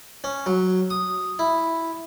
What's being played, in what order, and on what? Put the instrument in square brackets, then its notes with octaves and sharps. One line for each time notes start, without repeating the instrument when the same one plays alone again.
[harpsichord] C#4
F#3
D#6
E4